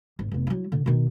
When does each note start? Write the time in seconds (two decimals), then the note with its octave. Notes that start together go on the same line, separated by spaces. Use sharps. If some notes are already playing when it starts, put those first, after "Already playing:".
0.19 G#1
0.32 F1 B3
0.47 F#3 E4
0.72 A#2 D3
0.86 B2 D#3